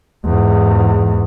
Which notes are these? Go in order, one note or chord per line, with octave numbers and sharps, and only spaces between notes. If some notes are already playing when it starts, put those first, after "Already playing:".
E2 G#2